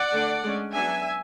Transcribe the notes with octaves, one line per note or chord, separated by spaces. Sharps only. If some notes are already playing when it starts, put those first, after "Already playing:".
Already playing: D5 F#5
D3 A3 D4
G#3 C#4
F#3 B3 D4 E5 G#5